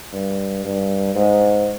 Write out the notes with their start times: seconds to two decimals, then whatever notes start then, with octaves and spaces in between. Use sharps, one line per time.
0.13 G2
0.64 G2
1.15 G#2